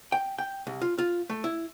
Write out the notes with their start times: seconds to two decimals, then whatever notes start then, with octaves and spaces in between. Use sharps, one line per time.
0.12 G5
0.38 G5
0.67 C2
0.81 F4
0.98 F4
1.30 A3
1.44 E4